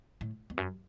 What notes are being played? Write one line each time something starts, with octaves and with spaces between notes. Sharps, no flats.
A2
E2
F#2